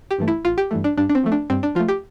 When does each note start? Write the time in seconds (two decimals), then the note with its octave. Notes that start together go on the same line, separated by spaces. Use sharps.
0.11 G4
0.18 G2 E3 A3
0.28 E4
0.45 A1 F4
0.58 G4
0.71 G2 E3 A3
0.84 D4
0.97 G2 D4
1.09 D4
1.15 C4
1.23 F3 A3
1.32 D4
1.50 G2 C4
1.63 D4
1.75 F3 A3 F4
1.88 G4